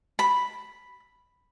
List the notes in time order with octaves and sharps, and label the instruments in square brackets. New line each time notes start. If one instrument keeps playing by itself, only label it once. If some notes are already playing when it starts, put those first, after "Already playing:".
[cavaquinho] B5